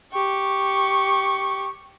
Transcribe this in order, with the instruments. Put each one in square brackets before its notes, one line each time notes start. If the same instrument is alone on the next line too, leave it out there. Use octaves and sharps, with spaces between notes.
[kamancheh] G4 C#6